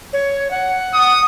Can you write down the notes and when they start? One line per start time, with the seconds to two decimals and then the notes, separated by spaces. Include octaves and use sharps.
0.13 C#5
0.51 F#5
0.94 D#6